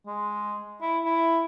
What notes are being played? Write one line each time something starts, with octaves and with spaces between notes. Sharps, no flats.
G#3
E4
E4